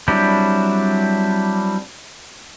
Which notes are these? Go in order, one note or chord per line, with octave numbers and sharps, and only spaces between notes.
F#3 G3 C4 D4 E4